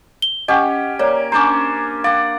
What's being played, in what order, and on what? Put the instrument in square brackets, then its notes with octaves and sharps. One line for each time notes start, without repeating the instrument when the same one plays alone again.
[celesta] G7
[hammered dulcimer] C#4 G4 [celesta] D#5 F#5
[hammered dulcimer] A#3 [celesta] C#5 D5
[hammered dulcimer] C#4 D4 C5 [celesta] A#5 D6
[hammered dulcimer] D5 F#5 [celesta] F5